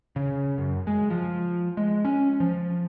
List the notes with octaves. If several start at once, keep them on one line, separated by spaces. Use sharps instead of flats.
C#3
F#2
G#3
F3
G#3
C#4
F3